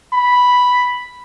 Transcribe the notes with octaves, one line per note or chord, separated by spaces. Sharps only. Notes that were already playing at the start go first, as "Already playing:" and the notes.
B5